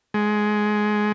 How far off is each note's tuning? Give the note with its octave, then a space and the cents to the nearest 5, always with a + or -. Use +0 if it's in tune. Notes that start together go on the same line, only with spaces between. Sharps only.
G#3 +15